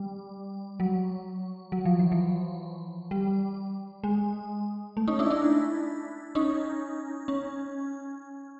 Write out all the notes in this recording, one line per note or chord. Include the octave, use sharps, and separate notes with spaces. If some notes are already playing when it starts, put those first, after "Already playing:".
Already playing: G3
F#3
F#3
F3
E3
F3
G3
G#3
A3
C#4 D#4
D4 E4
D4 E4
C#4 D#4
C#4